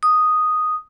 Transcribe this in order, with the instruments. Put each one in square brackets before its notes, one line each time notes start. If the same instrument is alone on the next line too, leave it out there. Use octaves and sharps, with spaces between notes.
[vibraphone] D#6